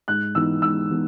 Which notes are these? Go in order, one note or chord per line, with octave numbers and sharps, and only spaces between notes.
G#2 F#6
E3 B3 D#4 E6
G#2 E6
E3 B3 D#4